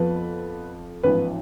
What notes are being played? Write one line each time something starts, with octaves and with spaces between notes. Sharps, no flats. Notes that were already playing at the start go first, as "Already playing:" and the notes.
Already playing: F2 F3 B3 B4
A1 G#2 F3 B3 B4